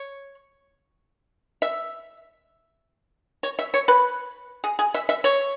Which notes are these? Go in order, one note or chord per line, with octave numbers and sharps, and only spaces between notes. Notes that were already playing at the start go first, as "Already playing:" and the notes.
Already playing: C#5
E5
C#5
E5
C#5
B4
G#4
G#4
E5
E5
C#5